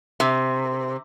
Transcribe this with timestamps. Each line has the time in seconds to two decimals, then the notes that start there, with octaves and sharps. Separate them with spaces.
0.20 C3